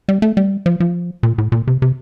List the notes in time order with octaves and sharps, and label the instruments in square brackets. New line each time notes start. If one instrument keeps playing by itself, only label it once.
[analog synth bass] G3
A3
G3
F3
F3
A#2
A2
A#2
C3
C3